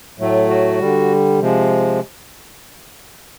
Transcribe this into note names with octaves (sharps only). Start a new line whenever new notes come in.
A2 F#3 A3
F#4
D3 G3
C3 F3 G#3